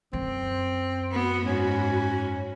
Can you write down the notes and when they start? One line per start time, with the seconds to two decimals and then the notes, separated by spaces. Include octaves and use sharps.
0.13 F#2 C4
1.11 B3 F#4 B5
1.46 G#2 C#4